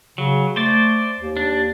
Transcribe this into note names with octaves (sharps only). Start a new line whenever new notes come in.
C#3 F#3
A3 C5 D5
D#2
D4